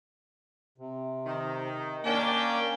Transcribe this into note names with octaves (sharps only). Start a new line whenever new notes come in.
C3
D#3
A#3 C#4 D4 G5